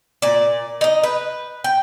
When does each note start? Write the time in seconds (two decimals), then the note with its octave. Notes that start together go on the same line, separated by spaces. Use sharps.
0.22 A#2 D5
0.81 D#4 D#5
1.03 B4
1.64 G5